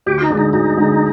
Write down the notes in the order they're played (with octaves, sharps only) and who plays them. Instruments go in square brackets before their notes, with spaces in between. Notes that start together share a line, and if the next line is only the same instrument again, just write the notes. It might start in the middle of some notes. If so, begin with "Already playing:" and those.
[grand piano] D2 [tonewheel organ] G4
[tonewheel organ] F4
D#4
[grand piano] D3 G#3 [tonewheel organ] D4
[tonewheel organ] D#4
[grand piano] D2 [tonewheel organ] D#4
[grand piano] D3 G#3